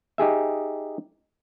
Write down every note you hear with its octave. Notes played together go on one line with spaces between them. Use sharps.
D#4 G4 G#4 E5